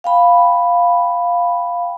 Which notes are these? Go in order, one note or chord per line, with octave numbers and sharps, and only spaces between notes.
F5 G5 B5